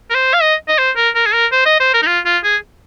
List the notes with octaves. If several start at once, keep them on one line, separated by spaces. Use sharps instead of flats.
A#4
C5
F5
D#5
D#5
C5
A#4
A#4
G#4
A#4
C5
D#5
C5
A#4
D#4
F4
F4
G#4